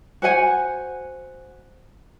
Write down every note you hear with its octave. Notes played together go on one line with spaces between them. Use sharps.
F#4 C5 F#5 G#5